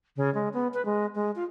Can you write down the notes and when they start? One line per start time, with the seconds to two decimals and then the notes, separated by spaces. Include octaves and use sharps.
0.17 C#3
0.34 G#3
0.54 B3
0.74 B4
0.85 G#3
1.15 G#3
1.36 F4